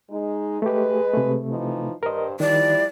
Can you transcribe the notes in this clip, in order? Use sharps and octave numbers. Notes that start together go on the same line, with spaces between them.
G#3 D#4
G#3 A3 G4 B4
C3 A3
E3 F3 D#4
G2 A#4 C5 D#5
D#3 F3 G3 E4 D5